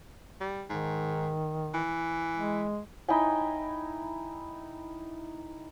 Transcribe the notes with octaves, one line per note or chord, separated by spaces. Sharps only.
G3
G#2 D#3
E3
G#3
D#4 E4 G5 G#5